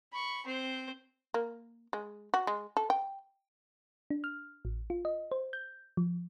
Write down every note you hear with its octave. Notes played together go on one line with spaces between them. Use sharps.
B5 C#6
C4 C5
A#3
G#3
F#4
G#3
A4
G5
D4
F6
A1
F4
D#5
C5
G6
F3